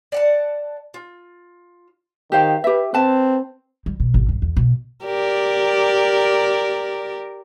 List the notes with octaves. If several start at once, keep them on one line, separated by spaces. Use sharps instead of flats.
D5 F#5 A5
F4
D#3 G4 C5 F5
G4 B4 E5
C4 B4 A5
G3
B2
G#1
G2
E2
B2
G4 A#4 D5